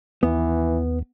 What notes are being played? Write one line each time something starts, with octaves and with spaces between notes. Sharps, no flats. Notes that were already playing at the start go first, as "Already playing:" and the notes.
D#2 E3 B3